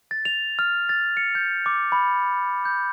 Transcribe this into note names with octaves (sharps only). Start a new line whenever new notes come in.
A6
F7
F6
A6
C#7
G6
D6
B5
G6